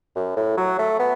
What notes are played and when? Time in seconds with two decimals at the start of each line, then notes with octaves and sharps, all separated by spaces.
0.15 F#2
0.36 A2
0.57 F#3
0.79 A3
1.00 B3